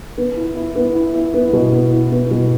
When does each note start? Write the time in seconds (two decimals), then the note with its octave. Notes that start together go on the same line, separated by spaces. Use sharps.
0.18 B3
0.36 E4
0.56 E4
0.75 B3
0.95 E4
1.14 E4
1.34 B3
1.53 B2
1.73 B3
1.92 E4
2.12 B3
2.31 B2